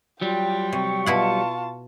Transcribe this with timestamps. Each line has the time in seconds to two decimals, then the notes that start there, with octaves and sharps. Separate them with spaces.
0.21 F#3 G3 F4 G5
0.73 C3 C#6
1.06 B2 E4 F4 F#5 A5